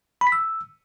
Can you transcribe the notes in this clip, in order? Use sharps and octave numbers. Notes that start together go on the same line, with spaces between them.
B5
B6
E6